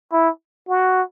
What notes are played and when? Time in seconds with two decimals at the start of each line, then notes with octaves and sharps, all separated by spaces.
0.12 E4
0.69 F#4